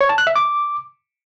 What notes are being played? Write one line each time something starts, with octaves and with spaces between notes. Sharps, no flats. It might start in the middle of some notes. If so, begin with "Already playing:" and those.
C#5
A5
F#6
E5
D6